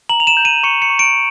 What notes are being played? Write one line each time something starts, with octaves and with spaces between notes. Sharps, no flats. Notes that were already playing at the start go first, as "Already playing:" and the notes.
A#5 F#7
F7
E7
G6
D#7
C#6 C#7
C#7
C#6
D7